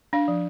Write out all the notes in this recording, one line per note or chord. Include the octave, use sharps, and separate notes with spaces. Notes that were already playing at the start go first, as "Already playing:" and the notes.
D4 F5
F3